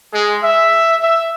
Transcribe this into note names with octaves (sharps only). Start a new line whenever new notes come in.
G#3
E5
E5